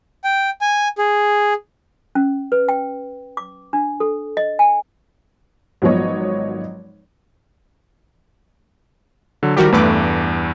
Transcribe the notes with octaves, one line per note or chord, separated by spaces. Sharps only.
G5
G#5
G#4
C#4
B4
G5
D6
D4
A4
D#5
G#5
G#1 F3 F#3 B3 C#5 D#5
D3 F#3
D#3 F3 G3 F#4 G4 A#4
E2 G2 A3 B4 D6